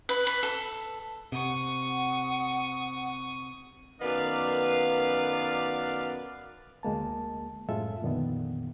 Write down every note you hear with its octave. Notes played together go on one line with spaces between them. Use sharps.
B4
B4
A4
C3 F#5 C#6 D#6
F#2 D#3 B3 B4 D5 F5
D2 G#3 A#3 A5
F#2 A2 G#3 F4 A4 E5
F2 A#2 D3 D#3 B3